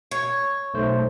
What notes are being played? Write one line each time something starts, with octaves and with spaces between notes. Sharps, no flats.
C#5
B1 A3 C5